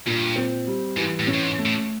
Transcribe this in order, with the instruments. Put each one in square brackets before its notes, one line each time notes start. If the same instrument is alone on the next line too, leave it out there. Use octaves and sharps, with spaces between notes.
[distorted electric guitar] G2 [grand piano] A#2
[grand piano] C4
G3
[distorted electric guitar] G#2 [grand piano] E3
[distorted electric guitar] A2
[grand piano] C#4
[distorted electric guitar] A2
G#2
[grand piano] A3
[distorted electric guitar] A2